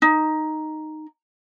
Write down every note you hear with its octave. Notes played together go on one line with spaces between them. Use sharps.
D#4